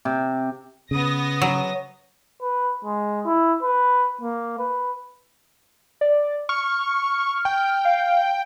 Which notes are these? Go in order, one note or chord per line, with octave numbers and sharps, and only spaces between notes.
C3
C#3 B3 D#6 A#6
F#3
B4
G#3
E4
B4
A#3
B4
D5
C#6 F6
G5
F5